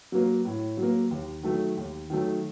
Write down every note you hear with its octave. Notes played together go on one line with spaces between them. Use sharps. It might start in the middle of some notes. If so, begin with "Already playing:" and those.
F#3 A#3
A2
F#3
A#3
D#2
D#3 F#3 A3
D#2
D#3 F#3 A3